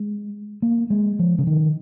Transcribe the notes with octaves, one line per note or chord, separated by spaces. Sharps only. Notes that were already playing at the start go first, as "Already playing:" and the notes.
Already playing: G#3
A#3
G#3
F3
C#3
D#3